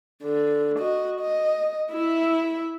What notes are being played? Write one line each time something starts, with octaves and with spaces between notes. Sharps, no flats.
D3
F#4 D#5
D#5
E4 E5